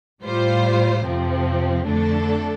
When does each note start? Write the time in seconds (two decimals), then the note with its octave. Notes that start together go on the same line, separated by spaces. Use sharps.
0.22 A2 G3 F4 C5
1.05 F2 C3 F3 C4
1.86 F2 D3 A3 D4 A4